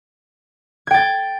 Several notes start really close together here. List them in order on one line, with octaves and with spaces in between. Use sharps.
G#6 G5 A6